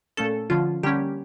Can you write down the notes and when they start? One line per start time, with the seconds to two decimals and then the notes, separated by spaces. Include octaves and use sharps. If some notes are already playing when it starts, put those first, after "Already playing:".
0.17 A#2 A3 C#4 A4
0.50 D3 F3 C#4 F4
0.83 D3 G3 A#3 C#4 G4